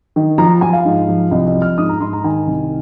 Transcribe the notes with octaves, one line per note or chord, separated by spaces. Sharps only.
D#3
F3 A#5
F3 G#5
F5
G#2
F3
C2 D#5
D#5
F3
F6
G#2 D#6
A#5
G#2 C6
A#5
D#3 G#5
C2